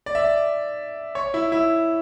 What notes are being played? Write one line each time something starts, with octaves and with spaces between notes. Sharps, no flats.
D5
E5
D5
C#5
E4
E4